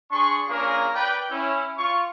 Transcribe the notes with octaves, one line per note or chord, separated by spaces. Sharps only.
D4 G#4 C6 C#6
A#3 C#4 D4 F4 G#4 A#4
B4 D5 G5
C#4 E4
F4 C#6